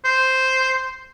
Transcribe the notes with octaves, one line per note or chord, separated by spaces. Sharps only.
C5